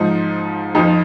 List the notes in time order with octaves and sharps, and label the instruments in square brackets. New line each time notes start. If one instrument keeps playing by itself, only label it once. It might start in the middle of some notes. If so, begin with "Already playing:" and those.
Already playing: [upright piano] G#2 F3 D#4
F2 F3 D#4